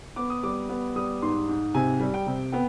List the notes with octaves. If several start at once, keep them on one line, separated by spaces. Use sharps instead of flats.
B3 D6
D#6
G3 D6
B3
G3 D#6
G#2 C6
G#2
C3 G#5
G3
G5
C3
B3 G5